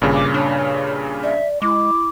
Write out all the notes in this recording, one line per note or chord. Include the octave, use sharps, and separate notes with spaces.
G#1 G2 A#2 C#3
D6
D4 C#5
D5 E5
G#3 E4 D6